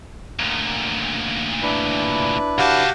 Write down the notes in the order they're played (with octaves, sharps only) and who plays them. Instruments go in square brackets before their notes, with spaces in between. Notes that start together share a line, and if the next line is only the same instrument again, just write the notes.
[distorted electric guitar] D2 A#2
[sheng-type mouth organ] D4 E4 B4
[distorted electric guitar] C#3 A5 [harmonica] F#4 G4 F5